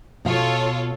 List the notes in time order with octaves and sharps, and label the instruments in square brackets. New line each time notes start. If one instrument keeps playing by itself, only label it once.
[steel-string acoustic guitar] B2 F5 [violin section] F4 A4 C#5